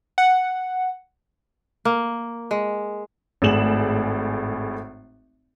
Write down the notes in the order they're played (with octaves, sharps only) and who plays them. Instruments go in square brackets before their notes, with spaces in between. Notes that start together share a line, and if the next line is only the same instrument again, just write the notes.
[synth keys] F#5
[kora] A#3
G#3
[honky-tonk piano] G#1 A2 G#4 E7 F#7